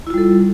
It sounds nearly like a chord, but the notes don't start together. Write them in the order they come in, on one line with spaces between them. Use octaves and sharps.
E4 F4 G3 A4